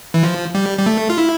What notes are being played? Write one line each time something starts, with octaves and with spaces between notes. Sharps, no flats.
E3
F3
G3
G3
A3
F4
E4